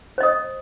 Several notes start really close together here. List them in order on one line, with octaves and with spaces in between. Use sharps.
C5 D#5 D#6